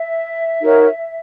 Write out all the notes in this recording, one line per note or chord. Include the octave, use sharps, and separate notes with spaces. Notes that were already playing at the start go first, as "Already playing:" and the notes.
Already playing: E5
D#4 F#4 A#4 C#5